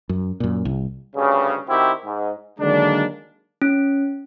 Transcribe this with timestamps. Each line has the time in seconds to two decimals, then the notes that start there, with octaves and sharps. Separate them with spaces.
0.09 F#2
0.40 F#2 A#2
0.65 C2
1.16 D2 G2 C#3
1.69 D#3 C4 E4 F#4 G4
2.05 G#2
2.60 D3 D#3 F#3 G#3 A#3 D4
3.62 C#4